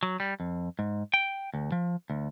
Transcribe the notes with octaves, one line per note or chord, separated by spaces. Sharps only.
F#3
G3
F2
G#2
G5
D2
F3
D2